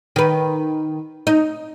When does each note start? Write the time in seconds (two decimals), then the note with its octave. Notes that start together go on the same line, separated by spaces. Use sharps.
0.16 D#3 B4
1.27 D#4